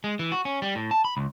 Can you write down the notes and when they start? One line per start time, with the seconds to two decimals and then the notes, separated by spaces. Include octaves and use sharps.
0.04 G#3
0.19 E3
0.32 F#4
0.45 C#4
0.62 G3
0.75 A2
0.91 A5
1.05 B5
1.17 C#2